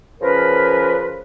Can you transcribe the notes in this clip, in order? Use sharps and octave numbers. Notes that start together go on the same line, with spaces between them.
C#3 F3 C#4 A#4 B4